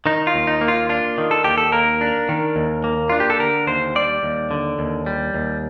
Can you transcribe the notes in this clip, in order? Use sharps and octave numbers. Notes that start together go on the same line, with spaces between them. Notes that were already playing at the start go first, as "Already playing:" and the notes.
D#3 D#4
F4
D#2
D#4
A#3
F4
D4 F4
D#3
A4
D#2 G4
A4
A#3 A#4
D4
D#3
D#2
A#3
D4 F4
G4
A4
D3 A#4
D#2 C5
G3 D5
D#2
D3
D#2
G3
D#2